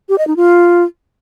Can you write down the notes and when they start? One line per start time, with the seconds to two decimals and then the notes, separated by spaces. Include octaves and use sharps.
0.09 G4
0.18 D#5
0.27 D#4
0.37 F4